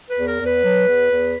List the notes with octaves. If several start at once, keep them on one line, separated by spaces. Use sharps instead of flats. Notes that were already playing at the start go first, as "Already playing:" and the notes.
B4
E2
A#4
E2
B4
F#3
E2
E2